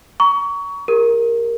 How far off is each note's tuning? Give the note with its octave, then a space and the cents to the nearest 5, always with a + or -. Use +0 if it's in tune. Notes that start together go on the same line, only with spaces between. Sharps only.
A#5 +20 C#6 +25
G4 +40 A#4 +0